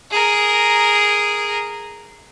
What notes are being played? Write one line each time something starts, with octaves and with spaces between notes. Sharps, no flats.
G#4 A#4